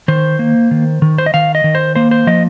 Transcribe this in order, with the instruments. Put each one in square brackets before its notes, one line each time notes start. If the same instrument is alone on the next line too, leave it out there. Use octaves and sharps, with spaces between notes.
[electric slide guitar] D#3 C5
A#3
D#3
D#3
C5
D#5
D#3 F5
D#5
D#3
C5
A#3 C5
C5
F3 D#5